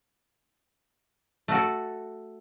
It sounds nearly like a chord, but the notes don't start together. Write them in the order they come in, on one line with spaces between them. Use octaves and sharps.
A3 F#4 A4